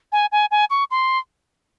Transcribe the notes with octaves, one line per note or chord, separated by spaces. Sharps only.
G#5
G#5
G#5
C#6
C6